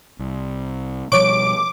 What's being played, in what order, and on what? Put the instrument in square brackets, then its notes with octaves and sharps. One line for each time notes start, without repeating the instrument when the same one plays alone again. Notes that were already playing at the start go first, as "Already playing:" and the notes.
[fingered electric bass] C2
[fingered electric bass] B2 F3 G3 [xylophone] C#5 C#6 [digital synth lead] D6 [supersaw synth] D7